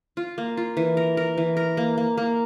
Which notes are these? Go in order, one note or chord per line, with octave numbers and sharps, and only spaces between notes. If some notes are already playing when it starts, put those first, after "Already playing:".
F4
A#3
F4
E3
A#4
A#4
E3
A#4
A#3
A#3
A#3